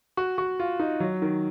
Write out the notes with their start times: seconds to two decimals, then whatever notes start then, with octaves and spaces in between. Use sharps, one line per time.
0.17 F#4
0.38 F#4
0.60 F4
0.79 D#4
1.00 F#3
1.22 D#3